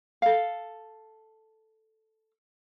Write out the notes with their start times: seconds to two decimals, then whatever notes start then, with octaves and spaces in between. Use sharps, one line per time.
0.22 A4 F5